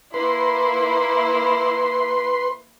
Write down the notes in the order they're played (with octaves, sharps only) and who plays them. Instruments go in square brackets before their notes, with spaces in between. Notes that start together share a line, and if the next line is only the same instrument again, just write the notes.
[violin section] A#3 E4 [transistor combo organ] B4 C6